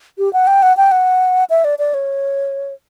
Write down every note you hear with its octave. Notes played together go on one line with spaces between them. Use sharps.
G4
F#5
G5
F#5
G5
F#5
E5
D5
D5
C#5